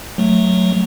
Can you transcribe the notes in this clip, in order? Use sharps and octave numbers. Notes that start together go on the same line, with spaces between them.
F#3 A3